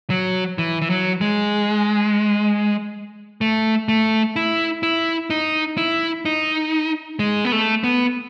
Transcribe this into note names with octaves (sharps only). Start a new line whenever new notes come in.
F#3
E3
E3
F#3
G#3
A3
A3
E4
E4
D#4
E4
D#4
G#3
B3
A3
B3